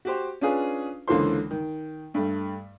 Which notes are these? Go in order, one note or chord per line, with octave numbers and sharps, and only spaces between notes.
F#4 G4 C5
C#4 D4 F4 G#4 B4
C#2 D3 E3 A#3 C5 C6
D#3
G2 A3